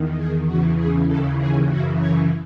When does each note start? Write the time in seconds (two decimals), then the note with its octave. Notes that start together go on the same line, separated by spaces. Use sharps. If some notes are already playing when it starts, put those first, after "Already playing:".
Already playing: E2 D#3
0.16 G#4
0.46 E2 C#3 E3 F#4
0.77 G#4
1.07 D#2 C#3 E3 A4
1.38 G#4
1.68 F#2 C#3 E3 F#4
1.98 C#5